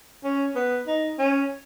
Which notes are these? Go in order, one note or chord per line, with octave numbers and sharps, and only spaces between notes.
C#4
B3
D#4
C#4